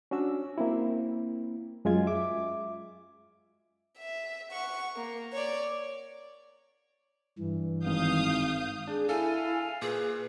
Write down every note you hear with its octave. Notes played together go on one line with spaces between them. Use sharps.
C#4 D4 F#4 E6
A#3 C4 E4
F#2 G#3 F4 G#6
E5 D6
E5
F#5 C#6
A#3
C#5 D5
G2 E3
G#1 F5 D#6 G6
D4 G#4
E4 A4 F5 G#5
A#2 G#4 B4